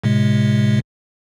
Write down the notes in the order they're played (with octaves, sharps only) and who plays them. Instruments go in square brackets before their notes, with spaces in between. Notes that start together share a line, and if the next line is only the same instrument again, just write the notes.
[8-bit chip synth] A2 C3 G#3